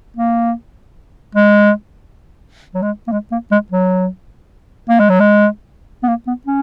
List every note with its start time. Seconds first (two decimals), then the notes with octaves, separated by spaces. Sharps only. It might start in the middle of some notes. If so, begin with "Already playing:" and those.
0.17 A#3
1.35 G#3
2.74 F#3
2.82 G#3
3.08 A#3
3.12 G#3
3.32 A#3
3.52 G#3
3.72 F#3
4.90 A#3
5.00 G#3
5.09 F#3
5.20 G#3
6.03 B3
6.08 A#3
6.27 B3
6.47 C#4